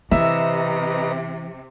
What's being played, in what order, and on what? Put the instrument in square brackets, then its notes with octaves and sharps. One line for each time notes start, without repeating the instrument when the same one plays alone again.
[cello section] C3 [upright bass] E3 [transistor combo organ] B4 D#5 A#5 [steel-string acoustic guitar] E5